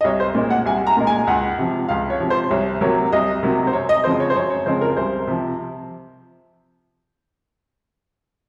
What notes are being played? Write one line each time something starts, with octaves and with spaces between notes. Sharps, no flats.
D#5
C2 C#5
C5
A#2 G#3
F#5
C2 G#5
A#5
A#2 G#3
G#5
C#2 F#5
C3 F3
C#2 F5
C#5
C3 F3
C5
C2 C#5
C3 F#3 A#3 C#5
C2 D#5
C3 F#3 A#3
C5
F#2 C#5
D#5
C#3 F3 G#3 C4 C5
C#5
C5
F#2 C#5
C#5
C#3 F3 G#3 C4 C5
A#4
C2 C5
C3 F3